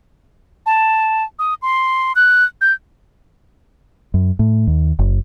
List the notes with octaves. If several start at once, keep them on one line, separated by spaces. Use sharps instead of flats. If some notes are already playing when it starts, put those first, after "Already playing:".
A5
D#6
C6
F#6
G6
F#2
A2
D#2
F#1